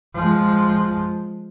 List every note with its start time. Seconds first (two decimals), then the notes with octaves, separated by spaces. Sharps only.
0.16 F3 G#3